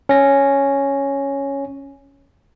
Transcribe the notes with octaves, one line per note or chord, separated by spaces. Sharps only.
C#4 A#6